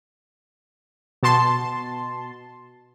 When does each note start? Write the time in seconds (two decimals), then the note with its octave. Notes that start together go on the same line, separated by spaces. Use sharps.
1.23 B2 A5 C6